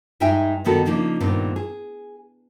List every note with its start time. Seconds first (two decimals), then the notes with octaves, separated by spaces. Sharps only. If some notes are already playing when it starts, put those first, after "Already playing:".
0.20 G2 G#3 D#4 E5 G5 G#5
0.65 G2 B2 D#3 B3 F#4 A4
0.86 C#3 F3 A#3 D4 D#4
1.20 G2 A#2 D#3 B3 C4 D4
1.56 G#4